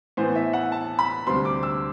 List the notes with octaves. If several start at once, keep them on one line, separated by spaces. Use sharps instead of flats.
A2 E3 B3 C5
E5
F#5
A5
B5
D2 C3 G3 C4 C6
D6
E6